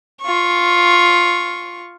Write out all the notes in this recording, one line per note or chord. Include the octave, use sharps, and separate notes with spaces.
F4 C#6